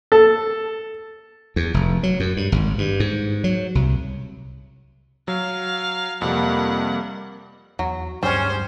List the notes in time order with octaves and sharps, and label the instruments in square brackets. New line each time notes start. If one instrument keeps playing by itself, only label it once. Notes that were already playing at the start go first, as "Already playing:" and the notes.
[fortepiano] A4
[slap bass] E2
F1
F#3
F#2
G2
G#1
G2
G#2
F#3
C2
[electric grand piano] F#3 [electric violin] F5
[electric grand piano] F2 C3 [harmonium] G3 A#3 [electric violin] F#5
[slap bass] E2 [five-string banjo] F#3
[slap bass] D2 G2 F#3 [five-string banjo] G3 G#4 [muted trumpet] C#4 [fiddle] C5